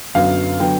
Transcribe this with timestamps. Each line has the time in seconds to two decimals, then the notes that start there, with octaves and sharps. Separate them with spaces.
0.15 F#2 D3 F#3 B3 F5
0.60 D3 F#3 B3 G5